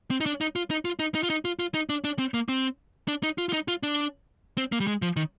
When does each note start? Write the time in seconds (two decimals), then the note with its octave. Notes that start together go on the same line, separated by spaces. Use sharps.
0.11 C4
0.21 D#4
0.26 D4
0.41 D#4
0.56 F4
0.71 D#4
0.85 F4
0.99 D#4
1.15 D#4
1.23 F4
1.30 D#4
1.45 F4
1.59 F4
1.74 D#4
1.89 D4
2.04 D4
2.19 C4
2.34 A#3
2.49 C4
3.08 D4
3.23 D#4
3.38 F4
3.49 F4
3.53 D#4
3.68 F4
3.83 D4
4.58 C4
4.72 A#3
4.80 G3
4.87 G#3
5.02 F3
5.16 D#3